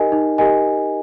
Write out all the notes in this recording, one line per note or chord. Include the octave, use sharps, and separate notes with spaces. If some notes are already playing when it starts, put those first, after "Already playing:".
Already playing: D#4 G4 A#4 D#5 G#5
D#4
G4 A#4 D#5 G#5